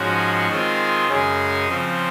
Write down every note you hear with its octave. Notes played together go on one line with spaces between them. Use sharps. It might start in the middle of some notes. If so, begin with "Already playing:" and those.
Already playing: G#2 F3 G#3 C#4 F#4
D#3 G#3 C4 F4 G#4
F#2 C#3 G#3 C#4 G#4
C#3 F3 C4